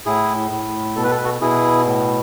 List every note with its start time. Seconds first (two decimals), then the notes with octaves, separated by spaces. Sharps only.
0.06 A2 E4 G#4
0.51 A2
0.96 B2 A4
1.04 B4
1.11 A4
1.17 B4
1.25 F#4 A4
1.41 B2 E4 G#4
1.86 A2